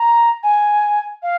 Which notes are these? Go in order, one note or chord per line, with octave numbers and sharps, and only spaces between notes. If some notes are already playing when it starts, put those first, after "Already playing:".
Already playing: A#5
G#5
F5